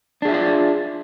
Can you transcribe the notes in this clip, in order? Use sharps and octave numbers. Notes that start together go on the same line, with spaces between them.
D4 F4 G#4 D5 E5